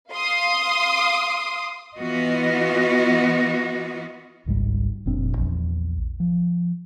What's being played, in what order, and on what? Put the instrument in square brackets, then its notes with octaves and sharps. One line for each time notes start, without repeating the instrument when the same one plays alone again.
[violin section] F5 C6 D#6
[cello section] E3 B3 F4 F#4 D#5
[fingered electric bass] G#1 C#2 G#2 G3
F1 A#2 C4 D4
A#1 E2
F3